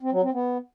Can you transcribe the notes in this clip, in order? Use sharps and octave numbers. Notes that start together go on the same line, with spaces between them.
C4
F#3
C4
B3